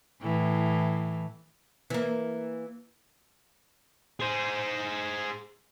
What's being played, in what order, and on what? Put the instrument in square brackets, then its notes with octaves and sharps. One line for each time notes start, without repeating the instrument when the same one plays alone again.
[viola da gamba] A2 E3
[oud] E3 A#3
[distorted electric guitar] G#4 C5